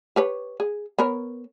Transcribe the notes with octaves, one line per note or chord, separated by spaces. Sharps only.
G4 B4 C#5
G#4
B3 A#4 C#5